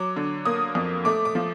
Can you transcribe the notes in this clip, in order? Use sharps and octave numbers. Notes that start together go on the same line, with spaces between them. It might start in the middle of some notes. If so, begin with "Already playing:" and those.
Already playing: F#3 D6
D3
A#3 D#6
F2
A3 D6
D6
F3